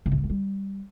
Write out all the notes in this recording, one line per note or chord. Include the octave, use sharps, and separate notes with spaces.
C#3
A2
G#2
A3
G3